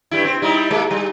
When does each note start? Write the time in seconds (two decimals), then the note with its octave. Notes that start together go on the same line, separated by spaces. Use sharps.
0.11 G2 G3 E4
0.25 C4
0.42 G3 D#4 E4
0.71 G#3 A#3
0.91 G3